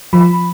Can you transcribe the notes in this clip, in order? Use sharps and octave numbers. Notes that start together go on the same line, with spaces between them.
F3 B5